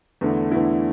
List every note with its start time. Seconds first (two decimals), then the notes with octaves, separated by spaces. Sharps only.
0.21 E2 D3 A3 E4
0.51 E2 D3 A3 E4